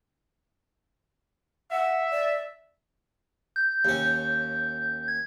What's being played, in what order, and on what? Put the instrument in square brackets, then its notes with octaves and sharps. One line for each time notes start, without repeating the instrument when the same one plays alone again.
[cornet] E5 [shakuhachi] F#5
[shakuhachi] D5
[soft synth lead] G6
[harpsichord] D#2 C#4
[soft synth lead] G#6